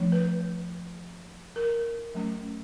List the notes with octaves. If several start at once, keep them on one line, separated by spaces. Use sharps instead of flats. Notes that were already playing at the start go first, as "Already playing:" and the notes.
Already playing: F3 A3 D4
B4
A#4
F#3 A3 C#4